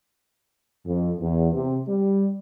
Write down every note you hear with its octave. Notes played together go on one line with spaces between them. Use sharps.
F2
E2
C3
G3